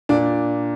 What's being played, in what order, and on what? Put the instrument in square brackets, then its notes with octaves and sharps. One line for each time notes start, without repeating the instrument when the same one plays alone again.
[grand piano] A#2 D4